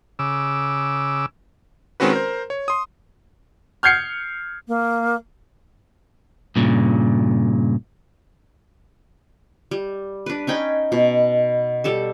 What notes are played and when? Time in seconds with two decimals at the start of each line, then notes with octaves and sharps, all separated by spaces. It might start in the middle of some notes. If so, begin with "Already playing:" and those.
0.19 C#3 D6 E6
2.00 D#3 G#3 C4 C#4 F#4 B4
2.13 A#4 C5
2.50 C#5
2.68 C6 D#6
3.83 F6 G6 G#6 C7 C#7
4.68 A#3
6.56 G2 A#2 C#3
9.71 G3
10.26 D4 B4
10.47 C#4 D#4 G5 B5
10.92 B2
11.84 G3 A4 A5